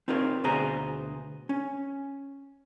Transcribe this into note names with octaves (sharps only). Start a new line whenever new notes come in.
C4 D#4 F4 A#4 B4 C#5
D2 B2 B3 G#4 C5 A#5
C#4